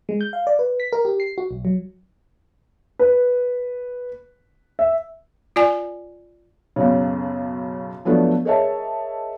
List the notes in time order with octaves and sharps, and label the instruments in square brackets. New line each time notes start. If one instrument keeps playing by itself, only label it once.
[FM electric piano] G#3
G6
F5
D5
B4
B6
A#4
G4
C7
F#4
B1
F#3
[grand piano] B4
E5
[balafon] F4 D5 G#5
[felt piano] B1 F#2 C#3
F3 F#3 A3 B3 D4
G#4 A#4 C#5 D#5 E5 A5